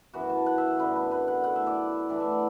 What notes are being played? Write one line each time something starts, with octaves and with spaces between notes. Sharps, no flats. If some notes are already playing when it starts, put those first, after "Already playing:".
F#2 E3 B3 F#4
A5
F#5
E5
F#2 D3 B3 B4
B4
B4
F#5
A2 A3 E4 F#5
E5
D5
A2 E3 A3 D4 D5
E5
D5